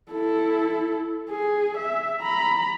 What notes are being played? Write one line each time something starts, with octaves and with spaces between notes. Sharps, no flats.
E4 A4
G#4
E5
A#5 B5